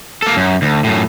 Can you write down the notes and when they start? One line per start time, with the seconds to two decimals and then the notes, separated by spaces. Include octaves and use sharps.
0.22 A#3 A4
0.37 F#2
0.62 D2
0.84 F#2 A2